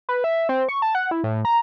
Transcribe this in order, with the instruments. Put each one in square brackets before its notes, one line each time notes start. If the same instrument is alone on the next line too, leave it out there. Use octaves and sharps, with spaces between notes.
[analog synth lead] B4
E5
C4
C#6
A5
F#5
E4
A2
A#5